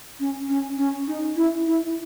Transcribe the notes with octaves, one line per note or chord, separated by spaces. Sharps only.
C#4
C#4
C#4
D#4
E4
E4